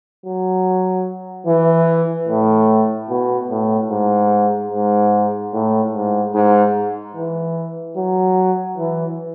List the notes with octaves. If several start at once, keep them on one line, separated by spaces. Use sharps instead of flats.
F#3
E3
A2
B2
A2
G#2
G#2
A2
G#2
G#2
E3
F#3
E3